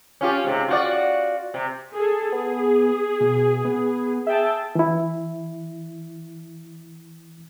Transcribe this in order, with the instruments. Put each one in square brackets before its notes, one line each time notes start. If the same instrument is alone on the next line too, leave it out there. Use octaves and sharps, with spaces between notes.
[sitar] C#4 F4 G4
G#2 C3
F4 F#4 D5
C3
[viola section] G#4 A4
[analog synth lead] B3 [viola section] G#4
[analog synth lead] B2
B3
[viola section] G#4 G5 A5 [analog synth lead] E5
[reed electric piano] E3 E4